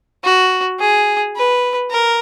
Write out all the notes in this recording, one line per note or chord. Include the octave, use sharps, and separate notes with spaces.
F#4
G#4
B4
A#4